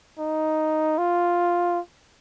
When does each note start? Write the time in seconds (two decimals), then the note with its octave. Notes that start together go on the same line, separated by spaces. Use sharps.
0.19 D#4
0.98 F4